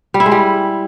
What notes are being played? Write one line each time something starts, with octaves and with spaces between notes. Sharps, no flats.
G3
E4
G#3
G3